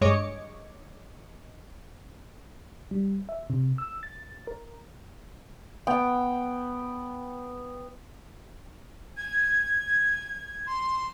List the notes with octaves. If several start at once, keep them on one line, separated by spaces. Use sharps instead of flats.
G2 G#3 C#5 D#5 D6 C#7
G3
E5
C3
E6
A6
A#4
B3 G5
G#6
C6